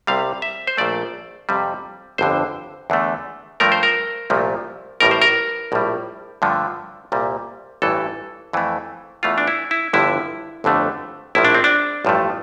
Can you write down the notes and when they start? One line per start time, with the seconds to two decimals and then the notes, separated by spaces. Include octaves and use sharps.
0.07 C2 C3 G3 F5
0.42 E5
0.67 C5
0.77 A#1 A#2 F3 A3 D5
1.49 F2 C3 G3
2.18 G1 F2 D3 C5
2.90 E2 D3 A3
3.60 G2 F3 A3 A#4
3.72 C5
3.83 A#4
4.30 C2 A#2 F3 A3
5.00 A1 A2 G3 A#4
5.11 C5
5.22 A#4
5.72 A#1 A2 G3
6.42 G2 D3 F3 A3
7.12 C2 A#2 G3
7.82 A1 G2 E3 A3 A4
8.53 F2 E3 A3
9.23 E2 E3 A3 F4
9.38 D4
9.47 E4
9.71 E4
9.93 G1 G2 D3 F3 E4
10.64 G1 F2 D3 A3
11.35 A#1 A2 F3 E4
11.45 D4
11.55 C4
11.64 D4
12.05 A1 G2 F3 A3